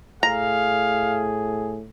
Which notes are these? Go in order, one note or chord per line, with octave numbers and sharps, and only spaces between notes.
A2 G#4 F5 A#5